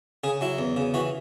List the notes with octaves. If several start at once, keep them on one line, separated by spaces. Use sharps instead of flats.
C#3 G#4
F#3 E4
E2
C#3
E3 F#4